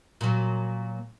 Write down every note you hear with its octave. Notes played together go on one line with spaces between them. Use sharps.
A#2 F#3